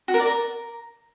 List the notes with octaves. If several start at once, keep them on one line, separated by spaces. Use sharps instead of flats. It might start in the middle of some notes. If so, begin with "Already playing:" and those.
F#4
A#4
D5
A#4